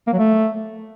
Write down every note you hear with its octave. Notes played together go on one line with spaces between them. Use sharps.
A#3
F#3
A3